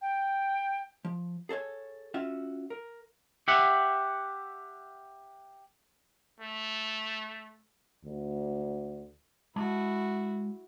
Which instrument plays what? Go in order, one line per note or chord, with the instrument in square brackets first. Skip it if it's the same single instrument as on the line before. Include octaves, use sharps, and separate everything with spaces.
[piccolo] G5
[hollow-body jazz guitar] F3
G#4 A4 C5 C#5
C#4 F4 F#4 E5
A#4
[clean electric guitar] G4 E5 F#5
[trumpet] A3
[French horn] D2
[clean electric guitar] G#3 A5 [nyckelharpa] E4 F#4